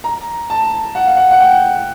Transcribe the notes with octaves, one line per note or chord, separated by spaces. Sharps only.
A#5
A5
F#5
F5
F#5
F#5
G5